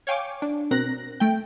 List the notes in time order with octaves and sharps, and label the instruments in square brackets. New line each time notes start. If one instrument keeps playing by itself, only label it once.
[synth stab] C#5 F5 G5 G#5 C#6 D6
D4
B2 C4 A#4 F#6 A#6
A3 G5